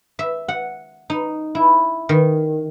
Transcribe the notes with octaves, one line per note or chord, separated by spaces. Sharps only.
E5
F#5
D#4
E4
D#3